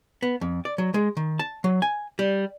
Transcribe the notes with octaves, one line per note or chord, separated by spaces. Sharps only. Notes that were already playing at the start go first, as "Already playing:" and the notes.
B3
F2
D5
F#3
G#3
D#3
A5
F#3
G#5
G3